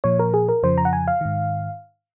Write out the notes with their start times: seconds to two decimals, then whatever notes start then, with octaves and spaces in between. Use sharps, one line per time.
0.04 A#2 F3 C#5
0.19 A#4
0.34 G#4
0.49 A#4
0.63 F2 C#3 F3 C5
0.78 A#5
0.85 F#5
0.93 G#5
1.08 F5
1.21 G#2 D#3